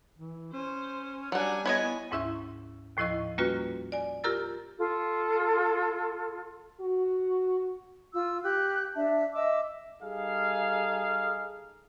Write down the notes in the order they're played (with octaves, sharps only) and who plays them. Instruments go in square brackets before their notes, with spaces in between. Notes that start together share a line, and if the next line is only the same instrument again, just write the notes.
[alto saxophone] E3
[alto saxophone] C#4 [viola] C5
[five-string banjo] F#3 F#5 [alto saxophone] G3 [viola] D4 G#5
[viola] B3 G#5 [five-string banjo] E4 C#5 D#5
[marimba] D2 G#2 C#4 E4 E5 C#6
D#2 A2 F3 E4 D#5 C#6
G3 A#3 C#4 F4 F#4 B4
D5 G#5
F4 G4 A#4 A#5 E6 A6
[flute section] F4 A4
[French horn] F#4
[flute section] F4 E6
G4 F#6
D4 E5 A5
D#5 E5 D6 E6
[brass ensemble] G3 D#4 G#4 A4 F5